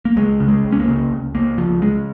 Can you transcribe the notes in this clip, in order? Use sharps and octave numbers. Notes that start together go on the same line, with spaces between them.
A#3
C#2 G#3
C#3
G#3
C#2
C#4
A#3
C#3
C#2
C#2 A#3
C#2 F3
C#3 G#3